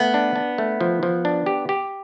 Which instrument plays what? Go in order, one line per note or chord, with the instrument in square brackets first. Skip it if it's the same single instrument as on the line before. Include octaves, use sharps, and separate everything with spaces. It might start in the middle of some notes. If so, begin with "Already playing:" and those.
Already playing: [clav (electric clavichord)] A3 [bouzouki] B3
[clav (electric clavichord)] D4
D4
A3
F3
F3
D4
G4
G4